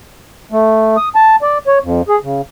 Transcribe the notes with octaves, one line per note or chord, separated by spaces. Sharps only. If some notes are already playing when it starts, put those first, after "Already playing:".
A3
D#6
A5
D5
C#5
F2
G#4
C#3